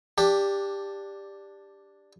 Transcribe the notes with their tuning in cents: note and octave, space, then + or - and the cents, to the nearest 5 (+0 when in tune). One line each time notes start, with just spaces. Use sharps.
D4 +0 G4 +15